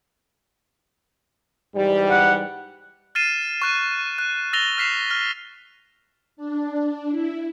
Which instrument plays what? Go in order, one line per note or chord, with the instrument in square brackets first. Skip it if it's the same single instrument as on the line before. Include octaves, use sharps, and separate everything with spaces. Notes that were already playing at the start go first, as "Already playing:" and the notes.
[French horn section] G#2 E3 G3
[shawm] F#5
[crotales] F6 A6 C7 D#7 E7
C#6 F#6 D#7
F#6
E6 A6 A#6 F7 G7
F6 F#6 B6 C7 E7 F7
F6
[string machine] D4
E4